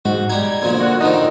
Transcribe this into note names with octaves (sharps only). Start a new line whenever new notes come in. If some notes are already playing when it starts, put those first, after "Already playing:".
G#2 F#4
G3 D#4 G#6
D2 A#2 F3
F#4
D3 D#3 F3 D#4